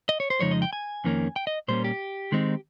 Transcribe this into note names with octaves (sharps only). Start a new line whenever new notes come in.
D#5
C#5
C5
F2 C#3 F3 G#3 D#4 C#5
D#5
G5
G#5
F2 D#3 A#3 C#4
G5
D#5
A#2 G3 A#3 C#4 C5
G4
D#3 G#3 C4 D#4